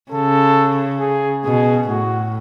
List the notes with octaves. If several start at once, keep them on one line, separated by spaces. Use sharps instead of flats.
C#3 A4
G#4
B2 G#4
A2 F#4